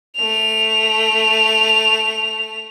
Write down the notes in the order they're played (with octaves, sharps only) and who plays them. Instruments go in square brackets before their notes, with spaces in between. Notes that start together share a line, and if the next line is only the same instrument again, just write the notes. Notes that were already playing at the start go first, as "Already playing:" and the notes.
[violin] A3 F7